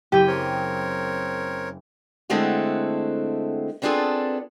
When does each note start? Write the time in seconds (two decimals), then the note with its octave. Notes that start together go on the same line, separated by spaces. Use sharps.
0.12 F#1 G4 G5 D#7
0.27 C4 A#4 C#5
2.30 D3 G#3 A3 C4 E4 F#4
3.82 B3 C4 D4 F4 G#4 A4